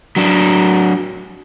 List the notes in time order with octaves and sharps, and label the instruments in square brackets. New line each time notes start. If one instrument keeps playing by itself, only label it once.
[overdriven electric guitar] F#3 D4